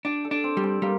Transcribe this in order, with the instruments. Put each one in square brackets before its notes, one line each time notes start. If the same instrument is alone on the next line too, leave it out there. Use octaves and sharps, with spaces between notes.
[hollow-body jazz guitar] D4 [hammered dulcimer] G4
[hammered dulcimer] A4
[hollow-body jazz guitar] D4
[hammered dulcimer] C4
[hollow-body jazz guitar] G3
[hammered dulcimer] C4
[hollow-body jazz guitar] G3 [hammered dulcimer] A#3